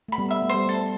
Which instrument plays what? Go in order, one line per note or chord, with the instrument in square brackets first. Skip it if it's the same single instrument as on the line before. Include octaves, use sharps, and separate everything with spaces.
[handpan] A3 [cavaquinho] B5
[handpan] G3 B3
[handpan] B3 [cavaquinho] E5
[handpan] A3
[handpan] G3 [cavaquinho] C5
[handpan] A3 [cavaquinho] A4